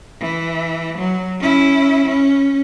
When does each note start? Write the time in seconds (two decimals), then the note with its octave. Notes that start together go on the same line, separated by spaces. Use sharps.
0.21 E3
0.98 F#3
1.40 C#4 E4
2.05 C#4